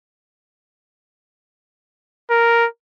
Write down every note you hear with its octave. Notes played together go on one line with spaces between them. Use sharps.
A#4